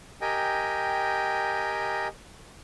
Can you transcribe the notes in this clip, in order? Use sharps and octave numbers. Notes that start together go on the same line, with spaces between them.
G4 A#4 D#5 G5 G#5